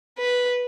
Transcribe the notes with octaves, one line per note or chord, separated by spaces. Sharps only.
B4